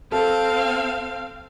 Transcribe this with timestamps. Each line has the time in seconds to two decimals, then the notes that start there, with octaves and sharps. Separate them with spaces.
0.12 C4 A4 F5